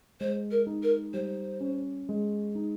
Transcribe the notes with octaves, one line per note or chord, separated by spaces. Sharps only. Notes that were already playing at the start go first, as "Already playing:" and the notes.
G#3 C5
A#4
D#4
A#4
G3 C5
C#4
G#3
D#4